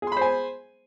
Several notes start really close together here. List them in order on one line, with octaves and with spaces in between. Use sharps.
G#4 C6 B5 C5 G#5